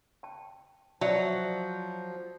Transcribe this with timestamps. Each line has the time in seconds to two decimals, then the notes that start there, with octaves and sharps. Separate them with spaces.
0.23 G5 A5
1.01 F3 F#3 D5 E5 A5